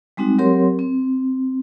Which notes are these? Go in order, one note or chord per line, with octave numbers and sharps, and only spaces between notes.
G3 G#3 C4 D#4 F#4
F#3 C4 G4 A#4 C#5 C6
C4